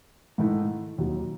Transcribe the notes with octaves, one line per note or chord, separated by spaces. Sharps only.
G#2 D#3 A3 E4
D#2 D#3 F#3